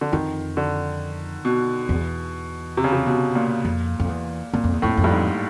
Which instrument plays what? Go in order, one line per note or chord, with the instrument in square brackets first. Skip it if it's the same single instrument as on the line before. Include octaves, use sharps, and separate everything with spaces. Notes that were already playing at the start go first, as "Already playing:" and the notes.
[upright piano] D3
[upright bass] F2 [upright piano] D#3
[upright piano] D3
B2
[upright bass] E2
[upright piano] C3
C#3
C3
B2
A#2
[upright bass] F2
F2
E2
[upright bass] F#2 [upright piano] A#2
[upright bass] F2
E2
[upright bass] F2 [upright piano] A2
[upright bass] F2
[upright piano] G2
G#2